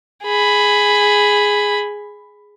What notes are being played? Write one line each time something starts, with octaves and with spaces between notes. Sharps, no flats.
G#4 B5